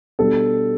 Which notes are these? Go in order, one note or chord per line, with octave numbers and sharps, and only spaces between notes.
B2 G3 D4 A4